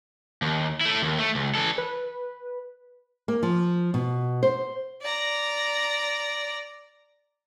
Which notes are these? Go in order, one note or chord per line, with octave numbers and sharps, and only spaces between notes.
D#2
A3 E4
D#2
A3
C#2
E3 A4
B4
A#3
F3
B2
C5
D5 A#5